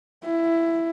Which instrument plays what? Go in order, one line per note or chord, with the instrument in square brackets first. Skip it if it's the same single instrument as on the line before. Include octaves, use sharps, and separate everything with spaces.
[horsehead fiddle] E4